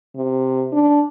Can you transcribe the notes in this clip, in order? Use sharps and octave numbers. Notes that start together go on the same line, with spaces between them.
C3
D4